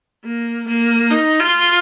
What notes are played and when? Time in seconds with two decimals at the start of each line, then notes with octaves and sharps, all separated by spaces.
0.24 A#3
0.68 A#3
1.11 D#4
1.40 F4